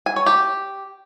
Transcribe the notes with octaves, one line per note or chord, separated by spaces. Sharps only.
G#5
C#5
G4